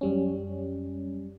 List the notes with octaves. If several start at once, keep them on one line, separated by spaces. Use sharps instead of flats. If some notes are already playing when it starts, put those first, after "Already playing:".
F#2 G3 C#4